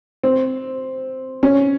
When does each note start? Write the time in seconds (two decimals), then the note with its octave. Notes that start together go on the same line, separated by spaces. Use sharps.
0.23 C4
1.43 C#4